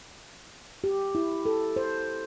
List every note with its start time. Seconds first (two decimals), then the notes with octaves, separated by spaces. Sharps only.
0.84 G4
1.15 E4
1.46 A4
1.76 C5